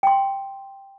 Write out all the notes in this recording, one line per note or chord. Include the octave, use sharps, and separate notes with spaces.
G5 C6